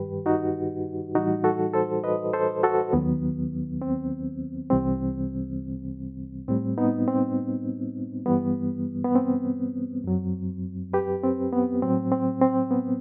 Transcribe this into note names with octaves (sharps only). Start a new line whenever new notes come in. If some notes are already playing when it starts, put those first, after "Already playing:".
Already playing: G2 D#3 G3 G4 B4
D#4 F#4
A2 E3 G3 D#4 F#4
F#4 A4
A4 C5
B4 D#5
A4 C5
F#4 A4
D#2 D#3 F#3 B3
C4
C2 C3 E3 G3 C4
A2 G3 C4
B3 D#4
C4
G2 E3 G3 B3
B3
C4
F#2 F#3
G4 B4
C4
B3
A2 F#3 C4
C4
C4
B3